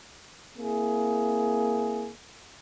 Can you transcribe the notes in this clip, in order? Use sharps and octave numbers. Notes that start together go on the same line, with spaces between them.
A#3 C4 E4 G#4